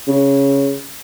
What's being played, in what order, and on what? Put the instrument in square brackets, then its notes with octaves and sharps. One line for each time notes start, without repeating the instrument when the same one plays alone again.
[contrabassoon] C#3